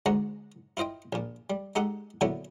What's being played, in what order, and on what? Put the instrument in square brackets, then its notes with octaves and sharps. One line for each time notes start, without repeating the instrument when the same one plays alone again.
[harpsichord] D2 G#2 G#3 F#5 A#5
E4 F4 C5 D#5 G5
A#1 A#2
G3
G#3 D#4 G4 A4 F#5
A#2 D3 F#3 B3 E4 A4